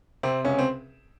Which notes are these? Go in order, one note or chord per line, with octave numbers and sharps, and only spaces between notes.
C3 C4
C#2 C#4
C4